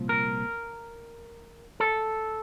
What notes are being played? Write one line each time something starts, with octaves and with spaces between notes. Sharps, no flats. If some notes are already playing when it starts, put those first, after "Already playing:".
Already playing: C2 A#2 F3
A#4
A4